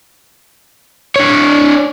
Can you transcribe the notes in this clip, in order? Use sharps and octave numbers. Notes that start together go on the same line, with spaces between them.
D4 C#5